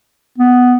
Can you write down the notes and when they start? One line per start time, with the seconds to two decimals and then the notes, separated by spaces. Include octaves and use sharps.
0.38 B3